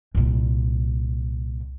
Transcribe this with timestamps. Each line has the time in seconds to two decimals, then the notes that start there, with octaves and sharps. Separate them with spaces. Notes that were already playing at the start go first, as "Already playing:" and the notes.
0.15 C2 A#2